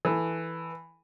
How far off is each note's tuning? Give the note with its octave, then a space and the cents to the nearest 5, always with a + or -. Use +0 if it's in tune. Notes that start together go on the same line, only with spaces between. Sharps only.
E3 +0 A4 +0